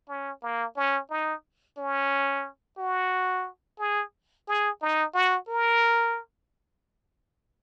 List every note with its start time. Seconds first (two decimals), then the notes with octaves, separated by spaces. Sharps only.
0.09 C#4
0.42 A#3
0.76 C#4
1.10 D#4
1.78 C#4
2.78 F#4
3.79 G#4
4.47 G#4
4.82 D#4
5.14 F#4
5.49 A#4